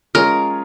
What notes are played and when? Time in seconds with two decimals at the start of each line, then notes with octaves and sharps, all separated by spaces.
0.15 G#3 C#4 F4 G#4 A#4 C#5